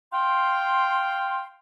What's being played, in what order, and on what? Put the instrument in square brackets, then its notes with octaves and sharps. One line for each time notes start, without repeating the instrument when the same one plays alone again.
[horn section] F5 G5 [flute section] C6